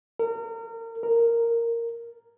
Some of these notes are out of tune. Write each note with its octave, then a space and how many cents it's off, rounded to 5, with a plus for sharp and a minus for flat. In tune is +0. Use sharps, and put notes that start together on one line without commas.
A#4 -30
A#4 -5